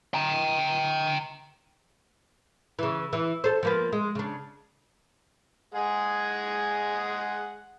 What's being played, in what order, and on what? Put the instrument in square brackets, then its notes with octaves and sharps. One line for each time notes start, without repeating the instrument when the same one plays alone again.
[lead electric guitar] G5 A#5
[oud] C#3 E3
E3
A4 C5
F3 A#3 B3
G#3
C#3 D4
[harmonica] G#3 G#4 F#5